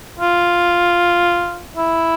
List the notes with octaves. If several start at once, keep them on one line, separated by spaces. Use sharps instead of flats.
F4
E4